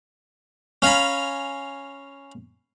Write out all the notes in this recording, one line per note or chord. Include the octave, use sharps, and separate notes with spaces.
C#4 F5 G#5 A#5 B5